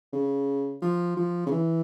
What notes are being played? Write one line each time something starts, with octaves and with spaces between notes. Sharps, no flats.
C#3
F3
F3
C#3
E3